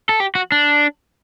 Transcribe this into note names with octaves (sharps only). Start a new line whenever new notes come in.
A4
G4
F#4
D4